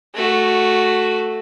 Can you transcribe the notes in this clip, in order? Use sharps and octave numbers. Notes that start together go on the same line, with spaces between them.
A3 F#4